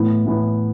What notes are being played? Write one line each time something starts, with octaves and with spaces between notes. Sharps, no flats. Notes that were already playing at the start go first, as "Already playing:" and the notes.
Already playing: A2 E3 B3 E4
A2 E3 B3 E4